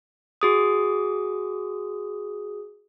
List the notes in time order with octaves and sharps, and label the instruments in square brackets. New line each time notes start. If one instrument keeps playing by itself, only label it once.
[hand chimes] F#4 G#4 D#6